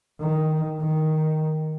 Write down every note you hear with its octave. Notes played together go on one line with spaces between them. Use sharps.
D#3
D#3